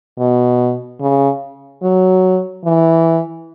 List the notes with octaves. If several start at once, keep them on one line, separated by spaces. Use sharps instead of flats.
B2
C#3
F#3
E3